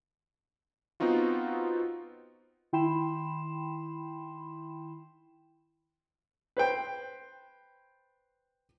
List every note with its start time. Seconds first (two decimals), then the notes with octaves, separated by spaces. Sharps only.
1.00 B3 C4 D#4 F4 F#4
2.73 D#3 E4 G5 B5 C6 E7
6.57 B4 C5 G5